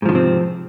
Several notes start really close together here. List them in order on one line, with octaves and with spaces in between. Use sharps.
G#2 F3 D#3 C3 C4